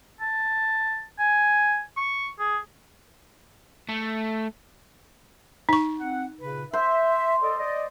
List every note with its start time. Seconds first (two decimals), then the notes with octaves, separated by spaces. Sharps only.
0.20 A5
1.19 G#5
1.96 C#6
2.39 G#4
3.89 A3
5.69 D#4 C#6
5.99 C4 F#5
6.40 A#2 C#3 B4
6.73 C5 E5
7.43 A4 D5 D#5
7.59 D5 D#5